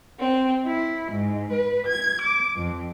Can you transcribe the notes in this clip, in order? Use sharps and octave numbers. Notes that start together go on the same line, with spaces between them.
C4
E4
G#2
B4
G#6
D6
F2